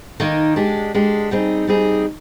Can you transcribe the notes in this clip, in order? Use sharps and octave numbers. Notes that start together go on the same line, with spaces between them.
D#3 A#3 D#4
G#3 D4 G4
G#3 D4 G4
G3 C4 D#4 G#4
G3 C4 D#4 G#4